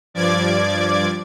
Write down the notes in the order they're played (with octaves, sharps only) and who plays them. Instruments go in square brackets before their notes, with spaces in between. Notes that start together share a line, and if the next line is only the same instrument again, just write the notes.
[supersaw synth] G2 F3 D5 D6 G#6